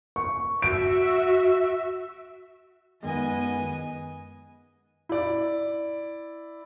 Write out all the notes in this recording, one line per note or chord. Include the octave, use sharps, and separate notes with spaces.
C#6
F#4 E5 D7
F#2 D#3 G#3 B3 D#5 G#5
E4 D5